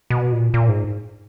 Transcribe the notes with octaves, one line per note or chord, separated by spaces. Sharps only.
B2
A#2
A#2
G#2